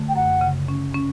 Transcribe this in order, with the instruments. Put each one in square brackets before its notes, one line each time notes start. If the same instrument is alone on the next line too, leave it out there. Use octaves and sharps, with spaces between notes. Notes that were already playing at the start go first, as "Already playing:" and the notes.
Already playing: [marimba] D3 A3
[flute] G5
[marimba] F#2 [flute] F#5
[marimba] C#3
C#4
C#4